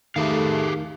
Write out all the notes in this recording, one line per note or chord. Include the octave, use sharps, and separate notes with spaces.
D#3 A3 G4 G#4 F5